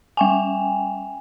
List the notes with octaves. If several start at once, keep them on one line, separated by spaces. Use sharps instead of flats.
G3 G5 G#5